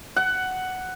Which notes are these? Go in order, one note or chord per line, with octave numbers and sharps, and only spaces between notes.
F#5